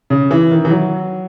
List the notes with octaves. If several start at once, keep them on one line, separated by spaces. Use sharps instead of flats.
C#3
E3
D#3
E3
F#3